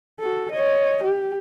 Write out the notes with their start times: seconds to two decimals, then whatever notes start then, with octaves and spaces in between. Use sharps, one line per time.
0.20 F#4 A4
0.52 C#5 D#5
1.04 G4